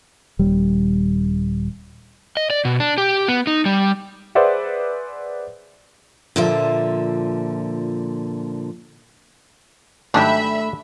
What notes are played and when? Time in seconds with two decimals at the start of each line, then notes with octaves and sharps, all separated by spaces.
0.39 D#1 G3
2.37 D#5
2.50 D5
2.65 B2
2.80 D4
2.98 G4
3.28 B3
3.47 D#4
3.66 G3
4.35 G#4 B4 C5 D5 E5 F#5
6.36 A#2 D3 F3 E5
10.14 G#2 D#3 F#3 A3 D4 G4 E5 B5